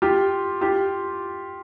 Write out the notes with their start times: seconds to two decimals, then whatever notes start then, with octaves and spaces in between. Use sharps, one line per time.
0.02 F4 G4
0.61 F4 G4